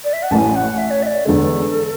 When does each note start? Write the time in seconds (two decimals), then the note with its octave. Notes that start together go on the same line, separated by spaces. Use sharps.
0.04 D5
0.12 E5
0.22 F#5
0.31 A1 A2 E3 G#5 A5
0.55 F#5
0.77 E5
0.90 C#5
1.02 E5
1.06 D5
1.25 E2 D3 G#3 A4